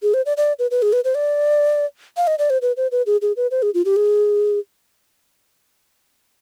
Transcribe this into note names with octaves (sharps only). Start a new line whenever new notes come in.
G#4
C5
D5
D5
B4
B4
G#4
B4
C5
D5
F5
D#5
D5
C5
B4
C5
B4
G#4
G#4
B4
C5
G#4
F4
G4
G#4